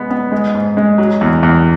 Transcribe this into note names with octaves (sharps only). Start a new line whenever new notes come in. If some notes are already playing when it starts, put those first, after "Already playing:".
Already playing: G#3 B3
B3
G#3
G#2
G#3
F#3
E2
E2